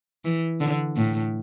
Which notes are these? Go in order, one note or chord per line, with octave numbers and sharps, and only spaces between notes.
E3
D3
A2